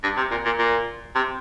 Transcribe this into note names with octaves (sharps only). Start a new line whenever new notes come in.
G2
C3
A#2
A#2
A#2
C3